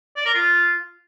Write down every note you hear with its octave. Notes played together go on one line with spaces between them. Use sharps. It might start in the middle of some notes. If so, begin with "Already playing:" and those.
D5
A#4
F4